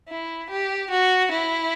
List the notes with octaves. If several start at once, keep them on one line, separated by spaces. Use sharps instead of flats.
E4
G4
F#4
E4